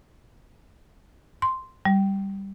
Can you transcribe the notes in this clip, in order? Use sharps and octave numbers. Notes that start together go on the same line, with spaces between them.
C6
G3